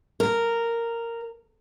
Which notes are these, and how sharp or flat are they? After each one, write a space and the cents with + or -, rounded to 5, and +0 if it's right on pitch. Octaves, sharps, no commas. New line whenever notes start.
A#4 -10